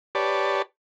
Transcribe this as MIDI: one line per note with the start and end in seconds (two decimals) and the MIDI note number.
0.15 0.62 67
0.15 0.62 71
0.15 0.62 73
0.15 0.62 74
0.15 0.62 81